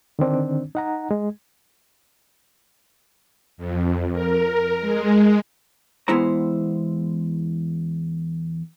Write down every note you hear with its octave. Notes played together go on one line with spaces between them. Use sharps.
D3 D#3 C4 D4
D#4 F#5 A#5
G#3
F2
A#4
G#3
E2 G#3 B3 E4 C5 A#5